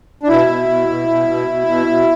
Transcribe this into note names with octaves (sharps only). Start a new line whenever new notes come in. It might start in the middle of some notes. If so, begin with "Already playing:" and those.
D4
B2 E4
B2
B2
B2
B2
B2
B2
B2
B2